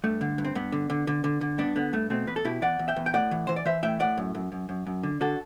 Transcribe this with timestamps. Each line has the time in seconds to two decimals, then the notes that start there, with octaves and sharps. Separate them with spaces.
0.04 G2 A3
0.21 D3
0.38 G2
0.45 C4
0.55 G2 B3
0.72 D3
0.90 D3
1.07 D3
1.24 D3
1.41 D3
1.58 G2 B3 D4
1.76 D3 B3
1.93 G2 A3
2.10 B2 A3 C4
2.27 E2 B4
2.36 A4
2.45 B2 E4 G4
2.62 E2 D5 F#5
2.79 E2
2.88 E5 G5
2.96 E2
3.06 G5
3.14 A2 D5 F#5
3.31 E3
3.47 E3 C5
3.56 D5
3.65 E3 C5 E5
3.83 A2 E5 G5
4.00 A2 D5 F#5
4.18 F#2
4.35 F#2
4.52 F#2
4.69 F#2
4.87 F#2
5.03 D3
5.21 D3 F#4 A4